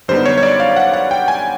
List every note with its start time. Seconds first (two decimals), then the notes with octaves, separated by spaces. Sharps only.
0.08 F#2 D3 G3 B3 D#4 C5
0.26 C#5
0.38 C#5
0.43 D5
0.60 F5
0.76 F#5
0.93 F#5
1.11 G5
1.28 G#5